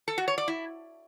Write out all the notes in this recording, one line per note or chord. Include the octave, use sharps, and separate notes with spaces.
A4
F#4
C#5
D5
E4